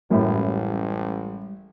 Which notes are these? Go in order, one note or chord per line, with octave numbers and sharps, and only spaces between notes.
A1 F#2 A2 G3 G#3